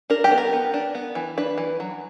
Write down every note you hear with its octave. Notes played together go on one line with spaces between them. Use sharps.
D4 A#4
G4
B3
A#4
B3
D4
B3
E3
D4 B4
E3
F#3